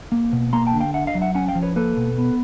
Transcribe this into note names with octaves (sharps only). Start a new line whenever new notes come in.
A#3
B2
A#3 A#5 C6
G5 A5
D3
F5 G5
D4 E5 F#5
D#5 F5
F#3
E5 F#5
C#4 F#5 G#5
F5 G5
F3
B4 C#5
A#3 A4 B4
B2
B3